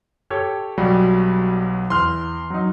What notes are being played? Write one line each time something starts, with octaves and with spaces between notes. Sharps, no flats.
G4 A4 C#5
B1 F#3 G3
E2 C6 F6
F#3 D#4